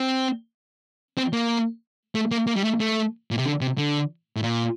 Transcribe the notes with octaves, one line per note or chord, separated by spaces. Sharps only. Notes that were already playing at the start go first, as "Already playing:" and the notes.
Already playing: C4
C4
A#3
A3
A#3
A#3
G3
A3
A3
A#2
C3
D3
C3
D3
A2
A#2